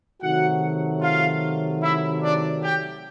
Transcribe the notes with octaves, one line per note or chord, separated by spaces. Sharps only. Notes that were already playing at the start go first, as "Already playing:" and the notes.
C3 D#3 F#3 A3 F#4 F#5
F4 F5
E4 E5
D4 D5
G4 G5